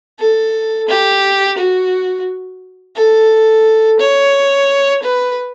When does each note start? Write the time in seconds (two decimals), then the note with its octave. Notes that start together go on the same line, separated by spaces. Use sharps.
0.19 A4
0.89 G4
1.58 F#4
2.96 A4
4.00 C#5
5.03 B4